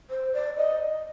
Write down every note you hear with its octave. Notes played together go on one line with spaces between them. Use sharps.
C5
D5
D#5